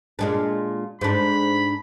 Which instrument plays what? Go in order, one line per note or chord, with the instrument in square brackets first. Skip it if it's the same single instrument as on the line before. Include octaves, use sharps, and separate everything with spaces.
[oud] A#2 G#3 D4
[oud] G#2 D4 [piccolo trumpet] B5